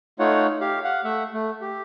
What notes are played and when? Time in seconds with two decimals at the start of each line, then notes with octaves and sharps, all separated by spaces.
0.19 A3 D#4 F4 C#5 F#5
0.61 G4 F5
0.84 F5 F#5
1.04 A3 E5 F#5
1.33 A3
1.62 G4